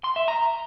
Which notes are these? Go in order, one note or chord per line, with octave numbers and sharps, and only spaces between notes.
C6
E5
A#5